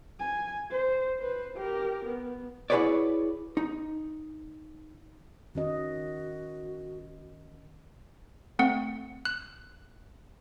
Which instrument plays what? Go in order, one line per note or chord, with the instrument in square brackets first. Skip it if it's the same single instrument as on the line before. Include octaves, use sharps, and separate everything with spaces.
[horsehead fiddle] G#5
C5
B4 C5
G4 A#4
B3
[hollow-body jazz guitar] E4 F#4 G#4 B4 C#5 D5
D#4
[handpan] D#3 C#4 D#5 [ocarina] F#4
[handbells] A3 C4 F#5
F#6